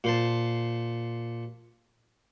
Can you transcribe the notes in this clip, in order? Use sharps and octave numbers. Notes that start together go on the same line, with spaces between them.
A#2 C5 A5